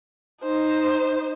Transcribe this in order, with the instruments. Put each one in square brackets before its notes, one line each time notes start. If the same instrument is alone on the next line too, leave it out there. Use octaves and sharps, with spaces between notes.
[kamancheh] D#4 C5